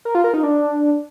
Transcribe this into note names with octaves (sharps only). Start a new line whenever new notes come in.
A#4
F4
A#4
D#4
D4